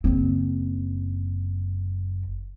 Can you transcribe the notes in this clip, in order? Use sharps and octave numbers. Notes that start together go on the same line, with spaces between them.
F#1 C4